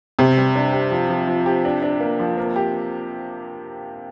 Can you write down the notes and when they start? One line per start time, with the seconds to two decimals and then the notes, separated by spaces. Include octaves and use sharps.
0.19 C3 G4
0.37 G3
0.56 D4
0.73 G4
0.91 F3
1.09 F3
1.27 F3
1.46 G4
1.65 D4
1.83 D4
2.00 A#3
2.19 F3
2.38 A#3
2.56 G4